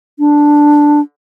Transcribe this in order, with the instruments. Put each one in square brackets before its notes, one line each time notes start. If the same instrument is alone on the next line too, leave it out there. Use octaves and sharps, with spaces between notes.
[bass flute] D4